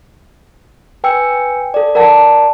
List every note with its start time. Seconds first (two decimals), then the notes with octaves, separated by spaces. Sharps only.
1.04 B4 G5 G#5 E6 C#7
1.74 A4 D5
1.95 A#4 D5 F#5 A5